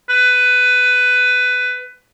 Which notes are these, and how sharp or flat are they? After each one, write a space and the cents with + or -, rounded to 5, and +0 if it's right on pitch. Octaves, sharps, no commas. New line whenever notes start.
B4 +15